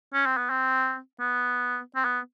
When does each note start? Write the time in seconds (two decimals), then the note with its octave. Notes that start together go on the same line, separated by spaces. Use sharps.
0.14 C#4
0.26 C4
0.37 B3
0.50 C4
1.20 B3
1.96 C4
2.04 B3